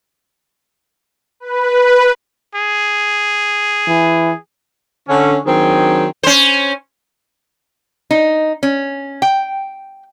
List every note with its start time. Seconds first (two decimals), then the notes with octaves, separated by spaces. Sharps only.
1.40 B4
2.55 G#4
3.88 E3
5.08 D3 C#4
5.46 D#3 F#3 C4 D4 G#4
6.23 C#4 C5
8.11 D#4
8.63 C#4
9.22 G5